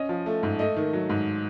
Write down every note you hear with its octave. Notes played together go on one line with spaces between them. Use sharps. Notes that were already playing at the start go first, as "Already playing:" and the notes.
Already playing: C#4 D#5
F3
A3
G#2
A3 D#5
D#3
F#3
G#2